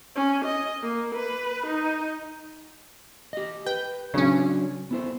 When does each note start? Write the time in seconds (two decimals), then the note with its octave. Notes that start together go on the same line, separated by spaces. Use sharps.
0.16 C#4
0.45 D#5
0.82 A#3
1.15 B4
1.67 D#4
3.33 G4 D#5
3.66 B4 G5
4.14 C#3 F#3 C#4 D4 D5
4.91 B3 E4 C5